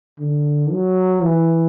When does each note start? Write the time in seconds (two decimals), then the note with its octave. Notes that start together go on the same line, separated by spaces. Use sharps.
0.19 D3
0.71 F#3
1.23 E3